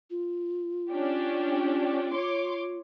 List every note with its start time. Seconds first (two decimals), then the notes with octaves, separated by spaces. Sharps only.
0.11 F4
0.90 C#4 D4 G4
2.12 C#5 C6 D6